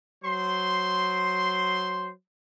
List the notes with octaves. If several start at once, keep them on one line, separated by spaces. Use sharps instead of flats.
F#3 C5 C6